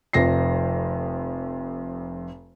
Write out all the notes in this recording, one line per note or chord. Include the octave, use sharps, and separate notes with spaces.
F1 F2 A#6 C7